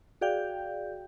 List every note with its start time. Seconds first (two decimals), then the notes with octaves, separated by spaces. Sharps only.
0.21 F#4 G#4 D5 F5 G5 G6